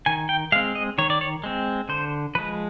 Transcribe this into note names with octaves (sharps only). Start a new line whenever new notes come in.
D#3 G#5
G5
G#3 C4 F5
D#5
D#3 C#5
D5
C#5
G#3 C4
D3 C5
F3 G#3 B4